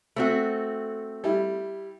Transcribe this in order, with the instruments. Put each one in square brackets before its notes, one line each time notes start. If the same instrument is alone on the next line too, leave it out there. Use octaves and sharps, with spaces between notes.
[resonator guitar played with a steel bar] A3 C4 F#4
[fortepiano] G3 E4